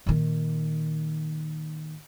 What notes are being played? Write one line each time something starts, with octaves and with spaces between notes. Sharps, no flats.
A#2 D#3